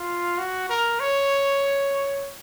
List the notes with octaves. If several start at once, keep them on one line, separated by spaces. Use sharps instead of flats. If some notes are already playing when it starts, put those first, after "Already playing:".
Already playing: F4
F#4
A#4
C#5